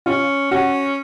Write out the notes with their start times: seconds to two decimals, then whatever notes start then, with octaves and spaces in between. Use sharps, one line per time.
0.06 C#4 F4
0.51 C#4 F#4